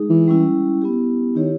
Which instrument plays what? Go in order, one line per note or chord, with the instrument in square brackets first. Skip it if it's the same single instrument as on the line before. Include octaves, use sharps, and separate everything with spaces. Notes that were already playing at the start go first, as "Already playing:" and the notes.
Already playing: [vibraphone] G#3 D#4 G#4
[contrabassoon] E3
[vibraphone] G3 C#4 E4
B3 E4 G4
[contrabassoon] D#3 [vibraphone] E4 G4 C#5